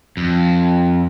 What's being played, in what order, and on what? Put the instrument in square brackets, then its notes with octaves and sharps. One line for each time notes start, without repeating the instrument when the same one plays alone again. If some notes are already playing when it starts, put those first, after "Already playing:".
[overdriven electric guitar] F2